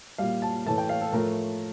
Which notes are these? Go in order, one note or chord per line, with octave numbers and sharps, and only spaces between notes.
A#2 G3 F5
A5
A2 E3 A3 A5
G5
F5
A4
A2 F3 A3 A#4